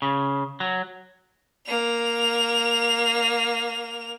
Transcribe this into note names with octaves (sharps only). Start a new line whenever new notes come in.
C#3
F#3
A#3 F7